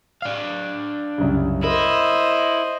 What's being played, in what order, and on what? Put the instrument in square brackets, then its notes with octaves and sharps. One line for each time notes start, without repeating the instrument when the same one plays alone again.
[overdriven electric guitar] D4 F5
[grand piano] C2 F#2 C#3
[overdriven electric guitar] E4 [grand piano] A#4 [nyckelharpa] C5 D#5